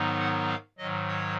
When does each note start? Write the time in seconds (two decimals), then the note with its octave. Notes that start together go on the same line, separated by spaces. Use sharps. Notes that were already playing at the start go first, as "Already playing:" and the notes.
Already playing: G#2 D#3 F#3 B3 D#4
0.19 F#5
0.49 F5
0.78 G#2 D#3 F#3 D#5
1.08 C#5